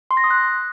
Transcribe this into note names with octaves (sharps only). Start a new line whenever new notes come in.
C6
A#6
D#6
F#6